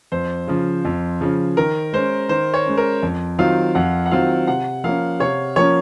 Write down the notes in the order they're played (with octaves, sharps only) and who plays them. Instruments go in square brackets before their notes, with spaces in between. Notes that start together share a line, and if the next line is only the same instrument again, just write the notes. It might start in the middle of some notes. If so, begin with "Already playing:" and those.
[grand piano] F2 [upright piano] C5
[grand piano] C#3 F3
F2
C#3 F3
[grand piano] D#3 [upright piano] A#4
[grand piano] G#3 C#4 [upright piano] C5
[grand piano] D#3 [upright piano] C5
[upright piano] C#5
[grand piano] G#3 C#4
[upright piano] A#4
[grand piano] F2
[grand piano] D#3 F#3 C4 F4 [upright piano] F5
[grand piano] F2 [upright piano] F#5
[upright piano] F#5
[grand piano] D#3 F#3 C4 F4 [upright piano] F5
[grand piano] C3 [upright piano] F#5
[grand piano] F3 A#3 C#4 [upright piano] F5
[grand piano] C3 [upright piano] C#5
[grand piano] F3 A#3 C#4 [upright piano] C#5